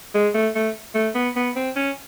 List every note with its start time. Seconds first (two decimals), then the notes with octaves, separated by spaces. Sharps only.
0.14 G#3
0.34 A3
0.55 A3
0.95 A3
1.14 B3
1.36 B3
1.56 C4
1.76 C#4